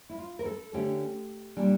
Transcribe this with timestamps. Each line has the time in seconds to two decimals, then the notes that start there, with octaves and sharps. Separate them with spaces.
0.09 E4
0.18 F4
0.39 A#4
0.46 A4
0.73 D3 A3 C#4 G4
1.57 A#2 G3 D4